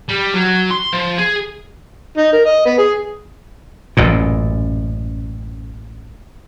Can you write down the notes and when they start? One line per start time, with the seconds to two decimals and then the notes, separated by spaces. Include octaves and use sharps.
0.09 G3
0.34 F#3
0.71 C6
0.93 F3
1.18 G#4
2.17 D#4
2.33 A#4
2.46 D#5
2.66 B3
2.78 G#4
3.97 A1 F#2 A#2